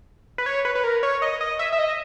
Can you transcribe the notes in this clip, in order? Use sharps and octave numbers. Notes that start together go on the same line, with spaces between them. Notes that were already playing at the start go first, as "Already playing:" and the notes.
B4
C#5
B4
B4
A#4
C#5
D#5
D#5
E5
E5
D#5